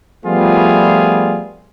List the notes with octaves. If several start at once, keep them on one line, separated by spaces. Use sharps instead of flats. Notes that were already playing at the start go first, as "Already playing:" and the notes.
F3 G3 A3 B3 F4 G#4